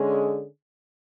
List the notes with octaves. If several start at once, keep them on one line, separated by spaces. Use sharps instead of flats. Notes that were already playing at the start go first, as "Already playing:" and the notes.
Already playing: D3 G#3 C#4 G#4